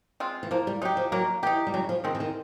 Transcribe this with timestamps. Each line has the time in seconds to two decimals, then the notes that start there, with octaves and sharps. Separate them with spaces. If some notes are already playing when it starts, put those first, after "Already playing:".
0.20 G#3 C4 F4
0.43 E3
0.51 F3 A#3
0.67 G3
0.82 F#3 D#4
0.85 G4
0.97 F3
1.12 F#3 A#3
1.43 E3 D#4 G4
1.67 G3
1.74 C#3 F#3
1.89 F3
2.04 D#3 F3 G#3 C4
2.15 E3
2.20 D#3